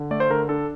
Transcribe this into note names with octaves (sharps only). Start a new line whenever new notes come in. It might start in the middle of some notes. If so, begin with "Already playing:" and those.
Already playing: D3
A3 D5
C5
D3 A#4
D4 A4